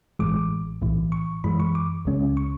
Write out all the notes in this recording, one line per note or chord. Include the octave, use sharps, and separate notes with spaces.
A1 A2 E3 G#3 D6
B1 A2 E3
C#6
F#2 E3 G#3 B5
C#6
D6
C#2 C#3 G#3 C#4
C#6